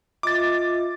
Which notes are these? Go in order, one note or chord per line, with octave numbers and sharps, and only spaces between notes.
F4 D#5 E5 D6 A6